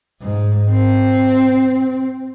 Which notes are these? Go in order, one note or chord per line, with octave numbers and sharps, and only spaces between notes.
G#2
C4